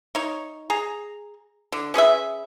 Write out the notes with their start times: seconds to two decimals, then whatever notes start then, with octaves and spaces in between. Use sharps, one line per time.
0.15 D#4 C#5
0.70 G#4 A#5
1.72 D3
1.94 C#4 G#4 B4 E5